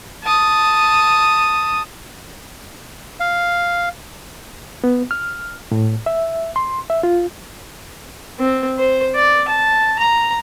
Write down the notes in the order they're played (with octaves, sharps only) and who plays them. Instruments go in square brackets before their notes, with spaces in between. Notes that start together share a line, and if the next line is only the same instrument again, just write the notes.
[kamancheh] A5 D#6
[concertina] F5
[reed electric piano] B3
F6
A2
E5
C6
E5
F4
[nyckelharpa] C4
C5
D5
A5
A#5